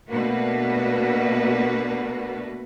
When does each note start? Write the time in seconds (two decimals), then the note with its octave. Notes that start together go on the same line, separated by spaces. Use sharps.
0.11 B2 A3 A#3 D4 F#4 B4